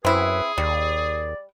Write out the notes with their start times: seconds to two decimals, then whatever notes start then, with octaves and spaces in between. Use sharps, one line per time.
0.05 F#2 C4 E4 G#4 B4
0.58 D#2 G3 D5